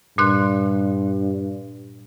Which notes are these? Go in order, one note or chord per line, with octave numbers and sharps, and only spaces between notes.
G2 A#2 C6 F#6